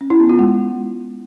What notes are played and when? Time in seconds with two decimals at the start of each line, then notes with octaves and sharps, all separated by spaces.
0.01 C#4
0.10 E4
0.20 B3
0.29 F4
0.39 G#3